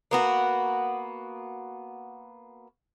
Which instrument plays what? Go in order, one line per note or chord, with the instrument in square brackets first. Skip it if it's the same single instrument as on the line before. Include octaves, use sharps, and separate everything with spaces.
[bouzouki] A#3 B3 F#4